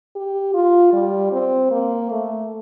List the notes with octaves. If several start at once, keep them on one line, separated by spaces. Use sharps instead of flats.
G4
F4
G3
C4
A#3
A3